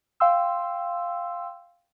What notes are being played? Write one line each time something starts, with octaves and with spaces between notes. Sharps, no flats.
F5 G5 C6 E6